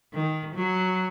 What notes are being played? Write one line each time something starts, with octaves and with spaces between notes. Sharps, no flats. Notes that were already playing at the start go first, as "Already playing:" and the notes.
D#3
F#3